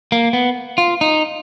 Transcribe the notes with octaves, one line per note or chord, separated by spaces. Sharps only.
A#3
B3
F4
D#4